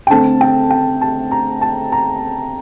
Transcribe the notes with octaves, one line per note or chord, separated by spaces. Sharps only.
G5
D3 A3 C4 A5
G5
G5
A5
A#5
A5
A#5